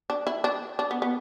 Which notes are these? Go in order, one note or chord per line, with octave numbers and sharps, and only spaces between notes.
D4
E4
D4
D4
B3
B3